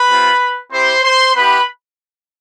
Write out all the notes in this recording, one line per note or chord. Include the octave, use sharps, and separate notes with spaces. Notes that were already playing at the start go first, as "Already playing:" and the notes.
Already playing: B4 B5
G3 C4 F4
C4 E4 G4 C5 C6
C5 C6
B3 E4 G4 B4 B5